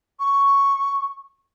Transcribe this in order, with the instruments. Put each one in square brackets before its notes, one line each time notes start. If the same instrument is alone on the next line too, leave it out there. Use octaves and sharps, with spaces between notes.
[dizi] C#6